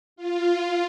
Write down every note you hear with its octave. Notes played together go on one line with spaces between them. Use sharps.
F4